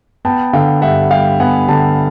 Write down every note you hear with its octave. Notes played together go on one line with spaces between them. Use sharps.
B3 G5 A5
D3 F5 G5
G2 E5 F#5
G3 F5 G5
B3 F#5 G#5
D3 G5 A5